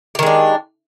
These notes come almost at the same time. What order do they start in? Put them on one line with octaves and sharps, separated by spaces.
G4 D#3 G#3 D4